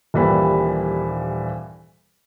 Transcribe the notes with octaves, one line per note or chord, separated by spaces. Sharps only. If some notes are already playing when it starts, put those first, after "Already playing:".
D#1 A#2 E3 G3 B5